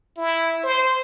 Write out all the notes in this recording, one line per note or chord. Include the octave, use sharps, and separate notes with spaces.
E4
C5